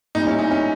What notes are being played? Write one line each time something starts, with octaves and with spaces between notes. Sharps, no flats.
A#2 G3 D#4
C#4 E4
D#4
C#4